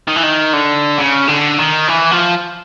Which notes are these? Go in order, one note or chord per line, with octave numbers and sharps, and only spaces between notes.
D#3
E3
D#3
D3
C#3
D3
D#3
E3
F3